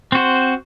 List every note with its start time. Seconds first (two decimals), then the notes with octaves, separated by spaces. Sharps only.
0.12 C4 F#4 C5